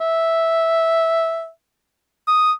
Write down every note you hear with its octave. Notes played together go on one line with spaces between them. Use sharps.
E5
D#6